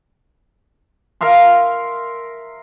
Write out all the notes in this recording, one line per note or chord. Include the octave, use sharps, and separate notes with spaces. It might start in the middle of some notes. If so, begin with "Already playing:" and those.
A#4 E5 F5 C6